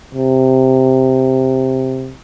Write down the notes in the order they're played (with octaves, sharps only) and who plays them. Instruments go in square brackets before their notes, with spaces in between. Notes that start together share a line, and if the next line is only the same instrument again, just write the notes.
[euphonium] C3